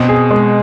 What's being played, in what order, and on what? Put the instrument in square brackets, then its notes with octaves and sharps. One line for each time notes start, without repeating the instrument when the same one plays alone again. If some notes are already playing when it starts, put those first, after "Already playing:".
Already playing: [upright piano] B2 [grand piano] C4
[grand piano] G#4
G#3